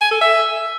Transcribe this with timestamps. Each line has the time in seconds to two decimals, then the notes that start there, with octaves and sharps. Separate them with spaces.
0.01 G#5
0.11 A4
0.21 E5